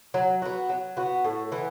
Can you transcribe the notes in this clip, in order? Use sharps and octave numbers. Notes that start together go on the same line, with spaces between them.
F#3
B3 F#4
F#3
B3 F#4
A2
E3 B3